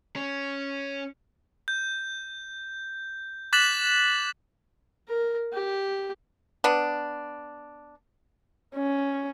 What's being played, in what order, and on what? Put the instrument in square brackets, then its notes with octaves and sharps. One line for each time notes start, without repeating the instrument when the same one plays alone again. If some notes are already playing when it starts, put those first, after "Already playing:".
[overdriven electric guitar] C#4
[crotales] G6
D6 F#6 A6 B6 E7 F#7
[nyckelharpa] A#4
G4
[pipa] B3 D4
[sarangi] C#4